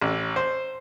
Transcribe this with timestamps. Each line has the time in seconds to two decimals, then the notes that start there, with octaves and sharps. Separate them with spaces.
0.02 A1
0.36 C5